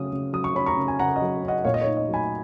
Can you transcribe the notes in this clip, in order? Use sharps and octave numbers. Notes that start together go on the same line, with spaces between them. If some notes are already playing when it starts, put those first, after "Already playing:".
Already playing: C#3 F#3 C#4 D#6
C#3
F#3 D#6
C#6
C#4 B5
A#5 C#6
C#3
G#5
C#3 F#5 A#5
D#5
F#3
C#4
D#5 F#5
A#2 C#5 F5
D#5
C#5
D#4
D#5
F#3
G#5 B5